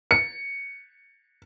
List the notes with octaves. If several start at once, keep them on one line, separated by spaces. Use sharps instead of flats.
C#7